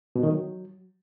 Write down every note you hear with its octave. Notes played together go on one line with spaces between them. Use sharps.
B2
D#3
F#3